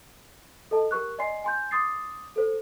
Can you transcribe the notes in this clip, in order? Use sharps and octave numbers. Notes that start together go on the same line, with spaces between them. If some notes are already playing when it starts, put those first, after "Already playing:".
A4 D#5 A5
G4 A#4 C#6 F#6
D5 D#5 G#5 C6 C7
G#5 C6 G6
C6 D6 D#6 A6 C7
A4 C5